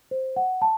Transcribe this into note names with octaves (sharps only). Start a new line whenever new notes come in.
C5
F#5
A5